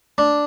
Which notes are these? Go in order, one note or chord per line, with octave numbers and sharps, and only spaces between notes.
D4